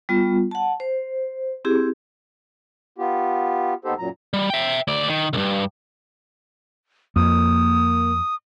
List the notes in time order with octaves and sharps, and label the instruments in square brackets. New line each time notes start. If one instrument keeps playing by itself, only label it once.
[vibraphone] G3 B3 F4
F#5 A5
C5
C4 E4 G4 G#4
[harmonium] B3 F4 G4
D#2 B3 D#4 G4 A4 C5
F#2 A#2 F#3 A#5
[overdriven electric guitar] G3
E5 G5
D2 D5
D#3
C2 G2
[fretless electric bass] F2 [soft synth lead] A#3 [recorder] D#6